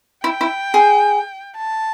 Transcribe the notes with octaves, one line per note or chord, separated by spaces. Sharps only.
E4 G5
E4
G#4
A5